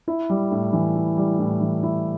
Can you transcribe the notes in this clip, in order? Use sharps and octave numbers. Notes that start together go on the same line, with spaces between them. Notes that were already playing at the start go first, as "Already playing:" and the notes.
E4
G3
A2
E3
E4
G3
A2
E3
E4